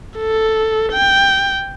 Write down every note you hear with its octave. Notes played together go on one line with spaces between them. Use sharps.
A4
G5